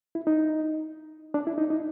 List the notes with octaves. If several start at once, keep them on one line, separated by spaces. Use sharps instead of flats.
E4
D#4
D4
E4
D#4
D#4